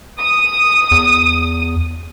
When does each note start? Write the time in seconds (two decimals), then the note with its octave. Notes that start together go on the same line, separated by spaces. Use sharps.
0.19 D#6
0.91 E2